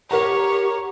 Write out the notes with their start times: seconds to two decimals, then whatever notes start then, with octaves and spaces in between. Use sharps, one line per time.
0.11 G4 A#4 C#5 F#5 A#5